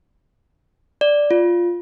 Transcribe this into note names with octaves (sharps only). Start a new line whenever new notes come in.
D5
F4